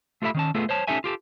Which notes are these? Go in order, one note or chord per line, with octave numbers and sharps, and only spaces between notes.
A3 F4 G4 A4 E5 B5
D#3 C#4 A5
A3 B3 F4 G#4 A4
C5 C#5 A5
C#4 D#4 G4 A4 E5 G#5
F4 G4 A4